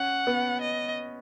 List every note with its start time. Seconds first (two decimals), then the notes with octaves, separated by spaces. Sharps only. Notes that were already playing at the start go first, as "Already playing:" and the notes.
Already playing: C#4 F#5
0.27 B3
0.61 D#5